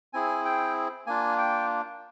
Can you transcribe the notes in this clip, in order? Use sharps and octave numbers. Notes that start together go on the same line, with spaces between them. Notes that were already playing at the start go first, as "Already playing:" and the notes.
C4 E4 G#4 G#5
G5
A#3 D4 F4 G#5
G5